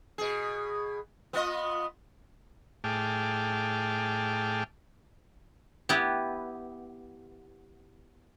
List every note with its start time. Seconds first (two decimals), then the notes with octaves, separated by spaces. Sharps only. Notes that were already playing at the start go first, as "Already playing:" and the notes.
0.18 B2 G#4
1.33 B3 F4 D#5
2.84 A2 G#4 G5 A5 D6 F6
5.89 B3 E4 G4